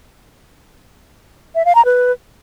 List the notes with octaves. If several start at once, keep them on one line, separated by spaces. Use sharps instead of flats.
E5
F5
A#5
B4